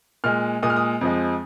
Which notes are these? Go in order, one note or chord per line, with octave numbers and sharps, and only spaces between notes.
A#2 G#3 F6
A#2 G#3 D#6
F6
D#6
F2 F3 G#3